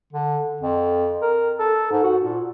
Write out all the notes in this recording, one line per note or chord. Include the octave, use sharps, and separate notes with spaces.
D3
F2
A#4
A4
G#2
F#4
A#2